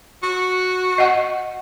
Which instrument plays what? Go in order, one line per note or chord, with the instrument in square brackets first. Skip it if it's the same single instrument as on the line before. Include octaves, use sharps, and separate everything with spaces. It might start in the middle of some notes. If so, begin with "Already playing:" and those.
[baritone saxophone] F#4
[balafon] D#5 F#5